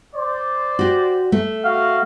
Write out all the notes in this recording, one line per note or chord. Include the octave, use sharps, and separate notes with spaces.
C5 D5
F#4 G4
A3
F#4 F5